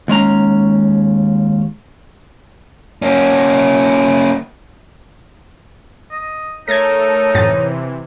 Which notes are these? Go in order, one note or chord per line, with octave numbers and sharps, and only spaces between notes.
D#2 G#3 C#4 A#5
A#3 C#4
D#5
A3 D#4 A4 A#4 C#5 G#6 A#6
F#2 A2 C3 E3 A6